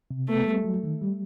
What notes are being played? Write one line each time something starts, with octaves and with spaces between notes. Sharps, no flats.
C3
A3 B3
G3
F#3
D#3
G3